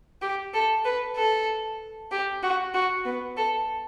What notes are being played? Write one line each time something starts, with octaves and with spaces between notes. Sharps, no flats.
G4
A4
B4
A4
G4
F#4
F#4
B3
A4